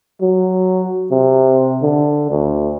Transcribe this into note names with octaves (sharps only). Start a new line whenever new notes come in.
F#3
C3
D3
D2